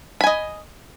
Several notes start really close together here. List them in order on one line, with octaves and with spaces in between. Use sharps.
B5 G#5 D#5